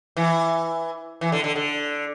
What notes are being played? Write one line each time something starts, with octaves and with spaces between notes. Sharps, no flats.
E3
E3
D3
D3
D3